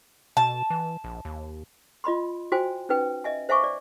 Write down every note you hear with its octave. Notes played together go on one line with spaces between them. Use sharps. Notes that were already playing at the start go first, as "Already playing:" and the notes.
B2 A5
E3
A#1
D#2
F4 D#5 B5 C6
F#4 C5 G5 G#5
C#4 D#4 B4 G5
D#5 E5 G#5
C5 E5 F5 G#5 C#6 D6
D5